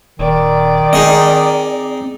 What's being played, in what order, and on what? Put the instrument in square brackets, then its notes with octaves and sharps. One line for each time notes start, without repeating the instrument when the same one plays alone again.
[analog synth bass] D#1 [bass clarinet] D#3 [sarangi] D5
[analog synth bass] C4 [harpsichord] D#4 G#4 D#5